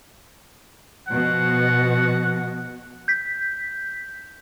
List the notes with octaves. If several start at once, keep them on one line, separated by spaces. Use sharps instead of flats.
B2 F3 F#5
G6 B6